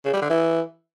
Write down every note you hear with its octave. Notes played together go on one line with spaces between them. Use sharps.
C#3
G3
D3
E3